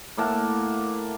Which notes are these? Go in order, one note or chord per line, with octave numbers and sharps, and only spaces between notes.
A2 A#3 F#5 A5